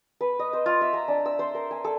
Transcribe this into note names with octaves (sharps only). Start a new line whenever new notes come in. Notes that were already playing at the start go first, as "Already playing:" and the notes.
B4
D#5
C5
F4
E5
A#5
D4
E6
C5
A#4
G#5
A4